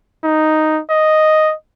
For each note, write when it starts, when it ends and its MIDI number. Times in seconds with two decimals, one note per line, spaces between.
0.24 0.80 63
0.90 1.53 75